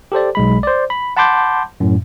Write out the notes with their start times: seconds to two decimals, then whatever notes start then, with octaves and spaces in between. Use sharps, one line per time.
0.12 G4 A4 C5 D5
0.35 B1 G#3 B5
0.63 C5 D5
0.90 B5
1.17 F#5 A5 B5 C6 D6 G6
1.80 F#2 A2